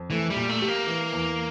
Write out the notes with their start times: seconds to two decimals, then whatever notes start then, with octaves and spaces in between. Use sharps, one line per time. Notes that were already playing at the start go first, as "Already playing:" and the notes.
Already playing: F2
0.10 E3 A3
0.30 G3
0.36 A#2
0.49 A3
0.62 G4
0.68 A#3
0.87 E3
1.13 E2